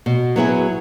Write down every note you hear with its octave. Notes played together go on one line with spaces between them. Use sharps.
B2
F#3 B3 E4 G#4